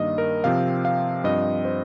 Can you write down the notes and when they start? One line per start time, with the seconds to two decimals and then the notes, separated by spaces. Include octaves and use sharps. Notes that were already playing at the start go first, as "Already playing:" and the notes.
Already playing: G2 D#3 A#3 D#5
0.18 A#4
0.44 C3 F3 C4 F5
0.85 F5
1.24 G2 F3 C4 D#5
1.65 C5